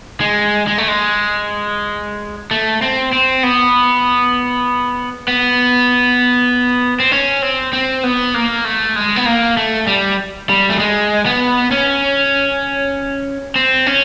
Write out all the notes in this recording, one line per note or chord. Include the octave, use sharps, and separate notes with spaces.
G#3
G#3
A3
G#3
A3
C4
C4
B3
B3
C4
C#4
C4
C4
B3
A#3
A3
G#3
B3
A#3
A3
G3
G3
A3
G#3
B3
C#4
C4
C#4